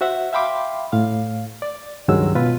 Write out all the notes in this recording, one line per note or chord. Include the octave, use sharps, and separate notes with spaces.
F#4 C5 E5 F#5
E5 F5 G5 B5 C6 D6
A2 F5
D5
C#2 G2 D#3 F#3 G#3 E6
B2 F4 B4